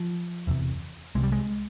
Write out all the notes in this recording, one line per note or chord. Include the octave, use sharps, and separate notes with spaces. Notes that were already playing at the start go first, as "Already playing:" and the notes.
Already playing: F3
E1 E2 C3
C2 C3 G#3
G3
G#3